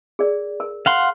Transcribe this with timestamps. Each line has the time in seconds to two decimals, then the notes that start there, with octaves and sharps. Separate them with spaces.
0.19 G#4 A#4 D5
0.60 A#4
0.86 F5 F#5 C6